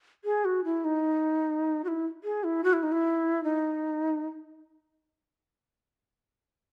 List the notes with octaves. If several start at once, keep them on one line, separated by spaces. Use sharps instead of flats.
G#4
F#4
E4
D#4
F#4
E4
G#4
E4
F#4
E4
D#4
E4
D#4